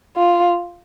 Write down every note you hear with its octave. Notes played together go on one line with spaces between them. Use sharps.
F4